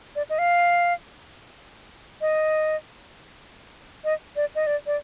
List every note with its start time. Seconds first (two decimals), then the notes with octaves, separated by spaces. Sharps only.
0.16 D5
0.30 D#5
0.39 F5
2.21 D#5
4.04 D#5
4.36 D5
4.55 D#5
4.67 D5
4.87 D5